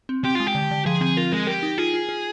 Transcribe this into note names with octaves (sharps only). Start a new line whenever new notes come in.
C4
C4 G4
G#3 F4
G4
D3
D3
F3 G#4
C4 G#4
F4 A#4
G#3 A#4
G4 A#4
D#4
F4 G#4
F4
F4